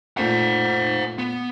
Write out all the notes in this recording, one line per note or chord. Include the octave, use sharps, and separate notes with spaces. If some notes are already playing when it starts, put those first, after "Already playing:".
A#2 A3 C5 F#5 B6
B3